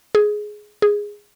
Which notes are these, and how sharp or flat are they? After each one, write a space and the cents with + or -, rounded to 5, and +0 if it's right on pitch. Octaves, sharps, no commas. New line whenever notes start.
G#4 +10
G#4 -10